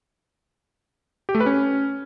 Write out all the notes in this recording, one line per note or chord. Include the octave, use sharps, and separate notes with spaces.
G4
A3
B4
C#4